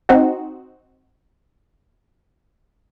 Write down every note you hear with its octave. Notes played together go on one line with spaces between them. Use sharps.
C4 D#4 F#4